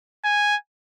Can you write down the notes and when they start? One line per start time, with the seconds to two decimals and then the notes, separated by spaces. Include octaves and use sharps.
0.24 G#5